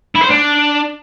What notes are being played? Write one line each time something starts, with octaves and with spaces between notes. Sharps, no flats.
E4
C5
D4